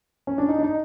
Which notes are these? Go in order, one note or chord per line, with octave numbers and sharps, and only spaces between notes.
C#4
D4
D#4
D4
D#4